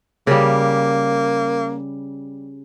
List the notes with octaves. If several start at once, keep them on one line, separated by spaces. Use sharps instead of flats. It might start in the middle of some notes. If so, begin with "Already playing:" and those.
C#3 G3 A#3